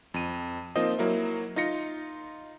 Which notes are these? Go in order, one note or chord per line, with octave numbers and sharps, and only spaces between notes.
F2 D#7
F3 A#3 C4 D#4 F4 D#5
F#3 A#3 E4
D#4 F4 A#6 C#7